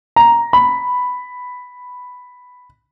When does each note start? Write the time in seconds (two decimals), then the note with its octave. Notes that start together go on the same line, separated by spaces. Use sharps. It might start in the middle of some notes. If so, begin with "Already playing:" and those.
0.16 A#5
0.53 B5